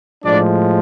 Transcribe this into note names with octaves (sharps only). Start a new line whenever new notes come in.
A2 F3 G#3 D4 D5